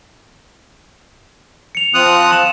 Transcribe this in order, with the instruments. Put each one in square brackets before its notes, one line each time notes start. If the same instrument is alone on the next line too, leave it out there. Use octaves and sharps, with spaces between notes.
[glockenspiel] C#7 F7
[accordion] F3 C4 F4 [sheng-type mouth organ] D#6 F#6
[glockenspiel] C6 E7